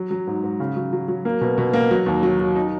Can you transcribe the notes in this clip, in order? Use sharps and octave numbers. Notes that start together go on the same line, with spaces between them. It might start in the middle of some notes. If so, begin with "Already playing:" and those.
Already playing: F#3
F#3
G#2
G#2
C#3
F#3
F#3
F#3
A#3
B2
B2
A#3
F#3
D#2
F#3
F#3
D#4